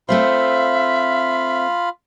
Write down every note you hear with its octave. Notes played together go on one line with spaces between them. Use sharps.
A3 C4 F4 C5 E5 F5 B5